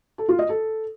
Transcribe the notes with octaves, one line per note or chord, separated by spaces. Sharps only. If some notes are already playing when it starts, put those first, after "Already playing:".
A4
F4
D#5
A4